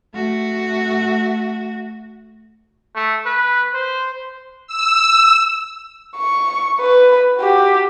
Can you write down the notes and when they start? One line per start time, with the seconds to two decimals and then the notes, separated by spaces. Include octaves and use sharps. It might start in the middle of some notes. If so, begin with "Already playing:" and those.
0.14 A3 F#4
2.95 A3
3.26 B4
3.74 C5
4.67 E6
6.17 C#6
6.81 B4
7.39 F#4 G4